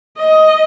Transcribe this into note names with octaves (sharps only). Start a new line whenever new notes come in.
D#5